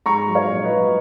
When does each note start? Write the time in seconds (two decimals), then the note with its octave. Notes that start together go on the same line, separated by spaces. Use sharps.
0.06 G#2 A#5 C#6
0.28 F#3
0.35 C#5 F5
0.49 A#1
0.64 B4 D#5
0.72 F#3